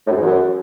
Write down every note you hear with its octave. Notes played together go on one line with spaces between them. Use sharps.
A2
F#2
G#2
E2
F#2